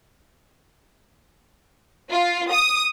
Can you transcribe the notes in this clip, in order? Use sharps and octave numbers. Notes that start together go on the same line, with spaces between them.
F4
D#6